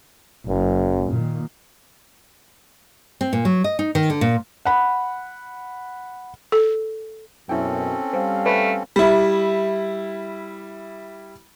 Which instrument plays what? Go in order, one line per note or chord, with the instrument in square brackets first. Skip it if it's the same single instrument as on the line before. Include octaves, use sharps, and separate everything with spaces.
[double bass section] F#1 [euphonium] F#2
[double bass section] A#2 D#3
[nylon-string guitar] C4
A#2
F#3
D#5
D#4
D#3
D3
A#2
[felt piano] F#5 B5
[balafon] A4
[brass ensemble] F#2 B2 [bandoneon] C4 C#4 A4 [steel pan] E4 G5
[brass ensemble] G3 F5 [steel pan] C5
[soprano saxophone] A3 [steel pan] B4 C#5 D5
[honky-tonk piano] G3 E4